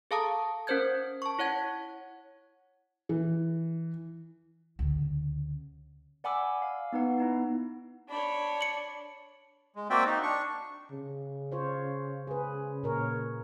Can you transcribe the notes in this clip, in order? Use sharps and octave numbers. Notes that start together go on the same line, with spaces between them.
G#4 A4 F5 A5 A#5 D#6
C#4 A#4 C5 G6 G#6
A5 C#6
E4 C#5 F#5 G#6
E3
D2 C#3
D5 F#5 G#5 B5 D6 E6
F5
B3 D#4 B4 F#5
B3 D#4 E4
D4 C#5 B5
C#7 F#7
G#3
A#3 C4 F#4 D5 E5 G5
D#4
D4 C#6
C#3
F4 C5 C#5
G#4 B4
A#2 A#4 C#5